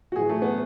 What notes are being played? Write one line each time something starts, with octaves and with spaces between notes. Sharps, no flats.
F#4
A2 E3 G#4
A3
B3